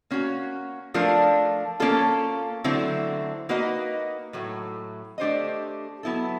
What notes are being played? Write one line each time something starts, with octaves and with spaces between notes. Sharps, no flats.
A#3 C#4 F#4
F3 A3 D4 F4 A#4
A#3 C#4 F4 A4
D3 F#3 A3 C4 E4
A#3 D#4 F#4 B4 D#5
A2 F#3 A3
A3 D4 G4 C5 D#5
F#3 B3 E4 A4